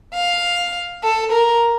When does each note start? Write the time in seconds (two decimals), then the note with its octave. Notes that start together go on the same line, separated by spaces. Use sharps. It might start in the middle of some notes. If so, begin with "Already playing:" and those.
0.14 F5
1.03 A4
1.32 A#4